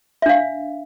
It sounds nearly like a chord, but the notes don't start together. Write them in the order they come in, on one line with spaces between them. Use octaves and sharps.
E5 D4 F5